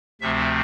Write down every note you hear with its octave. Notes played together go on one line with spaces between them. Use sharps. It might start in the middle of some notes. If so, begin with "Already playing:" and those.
D2 C3 F3 A3 C4 E5